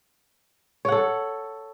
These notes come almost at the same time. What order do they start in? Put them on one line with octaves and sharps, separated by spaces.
C#5 F#5 A4